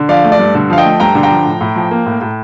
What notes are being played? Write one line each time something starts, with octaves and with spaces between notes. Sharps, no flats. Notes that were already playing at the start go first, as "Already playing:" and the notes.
Already playing: D3
F3 D5 F5
A3
D5
G2
D3
F3 F5
D#5 G5
A3
G2 G5 A#5
D3
G5 A#5
F3
A2
A2
F3
A#3
A2
A2